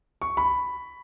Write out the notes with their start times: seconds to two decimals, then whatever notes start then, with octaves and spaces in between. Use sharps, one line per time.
0.22 C#6
0.37 B5